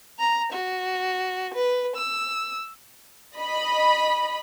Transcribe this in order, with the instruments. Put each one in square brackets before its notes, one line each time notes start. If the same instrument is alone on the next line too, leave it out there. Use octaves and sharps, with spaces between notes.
[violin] A#5
F#4
B4
E6
[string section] D#5 B5